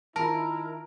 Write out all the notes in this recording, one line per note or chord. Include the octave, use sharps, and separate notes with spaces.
D#3 E4 F4 A#4 A5